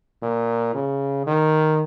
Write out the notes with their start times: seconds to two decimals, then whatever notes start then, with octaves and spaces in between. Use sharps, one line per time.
0.22 A#2
0.74 C#3
1.26 D#3